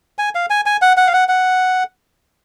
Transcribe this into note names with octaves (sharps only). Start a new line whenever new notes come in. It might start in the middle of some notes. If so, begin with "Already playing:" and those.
G#5
F5
G#5
G#5
F#5
F#5
F5
F#5
F#5